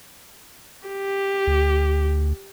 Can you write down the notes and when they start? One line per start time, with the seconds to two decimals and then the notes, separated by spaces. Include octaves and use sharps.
0.88 G4
1.47 D2